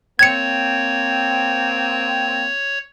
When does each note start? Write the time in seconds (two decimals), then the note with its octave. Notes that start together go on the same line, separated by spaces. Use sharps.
0.19 A#3 C4 C#5 G#6 C#7